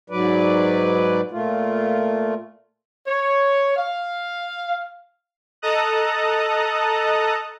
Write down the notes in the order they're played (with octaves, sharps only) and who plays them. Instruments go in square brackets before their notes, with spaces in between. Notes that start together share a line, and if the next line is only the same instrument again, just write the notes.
[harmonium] G#2 F#3 B4 D5
A#2 A3 F4
[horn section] C#5
F5
[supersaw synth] A4 D#5 A5 A#5 D#6 F#6